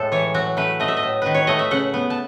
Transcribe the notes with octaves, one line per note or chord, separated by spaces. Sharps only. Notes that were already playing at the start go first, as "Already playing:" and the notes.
Already playing: A2 G#3 A4
E3 C#5
F#3 F#4
A3 B4
A3 D#5
E5
D#5
A2
D#3 B4
C#5
A3 D#5
E5
C#3 F#5
B3
A5